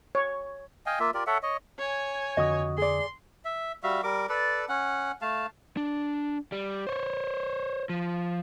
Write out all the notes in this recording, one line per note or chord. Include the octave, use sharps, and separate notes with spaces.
C#5
D#5 F5 G5 G#5
A#3 F4 E5
F4 G4 A#4 D5
A4 C#5 E5 F#5
C#5 D#5
C#5 G#5
F2 D3 F#4 D#5 D#6
G#4 D5 C6
E5
G3 F#4 E5 F5
G3 A#4 D6
A4 B4 D5
C#4 F#5
A3 F5 A5
D4
G3
C5 C#5
F3